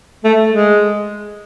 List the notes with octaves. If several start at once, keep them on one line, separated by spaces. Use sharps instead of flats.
A3
G#3